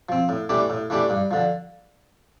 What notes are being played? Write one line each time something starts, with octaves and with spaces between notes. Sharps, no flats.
F3 C4
A2
E3 A3 D4 G4
A2
E3 A3 D4 G4
G2
D3 F3